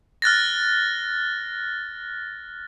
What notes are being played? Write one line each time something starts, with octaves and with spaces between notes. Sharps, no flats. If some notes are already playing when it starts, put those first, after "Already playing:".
F6 F#6 A6 A#6